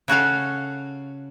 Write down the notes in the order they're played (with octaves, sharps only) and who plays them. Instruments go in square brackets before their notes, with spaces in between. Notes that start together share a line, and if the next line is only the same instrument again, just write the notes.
[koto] C#3 F#4 A4 F5